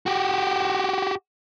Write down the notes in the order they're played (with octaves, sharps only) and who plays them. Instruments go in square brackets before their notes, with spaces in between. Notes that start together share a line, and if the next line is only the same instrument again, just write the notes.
[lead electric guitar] F#4 G4